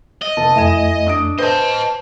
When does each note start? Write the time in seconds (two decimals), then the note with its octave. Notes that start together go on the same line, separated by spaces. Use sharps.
0.22 D#5
0.37 F1 A5
0.56 F2 A3 E4 G#5 E7
1.06 D4 D#6 D7
1.39 B4 C5 D#5 A5 G6